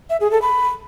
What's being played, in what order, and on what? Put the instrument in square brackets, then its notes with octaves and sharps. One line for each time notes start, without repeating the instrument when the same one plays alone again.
[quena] E5
G#4
A4
B5